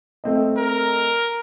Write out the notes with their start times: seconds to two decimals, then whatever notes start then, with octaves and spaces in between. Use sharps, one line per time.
0.24 A3 C4 D#5
0.58 A#4